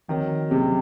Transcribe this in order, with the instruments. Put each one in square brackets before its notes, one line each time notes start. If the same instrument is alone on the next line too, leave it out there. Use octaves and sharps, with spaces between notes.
[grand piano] D#3 [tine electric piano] F3 C4 F#4 A#4 C#5
[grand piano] C3 [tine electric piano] D#3 F#3 C#4 G#4